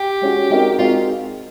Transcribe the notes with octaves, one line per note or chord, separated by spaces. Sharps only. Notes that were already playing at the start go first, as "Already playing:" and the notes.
Already playing: G4
G#3 C#4 F#4
G#3 C4 D#4 F#4 A#4
G#3 C4 D#4 F4 F#4 A#4